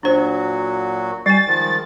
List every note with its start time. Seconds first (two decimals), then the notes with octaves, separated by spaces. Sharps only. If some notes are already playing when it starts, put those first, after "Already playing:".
0.03 A#2 F#3 D4 F#4 C5
1.26 G3 G5 G#5 A6
1.47 D#3 F3 G#3